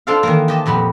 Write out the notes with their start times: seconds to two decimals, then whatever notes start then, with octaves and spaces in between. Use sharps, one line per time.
0.07 D4 F4 A4 C5 F5
0.23 D#3 E3 A#3
0.48 G4 D#5 A5
0.66 F2 A#2 B3 B5